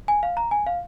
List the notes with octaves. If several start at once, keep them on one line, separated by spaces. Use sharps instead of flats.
G#5
F5
A#5
G#5
F5